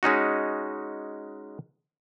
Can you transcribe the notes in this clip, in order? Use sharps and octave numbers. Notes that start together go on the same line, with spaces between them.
G#3 C#4 D#4 F#4